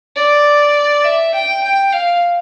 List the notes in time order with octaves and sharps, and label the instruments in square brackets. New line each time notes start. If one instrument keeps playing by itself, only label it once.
[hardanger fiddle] D5
E5
G5
G5
F5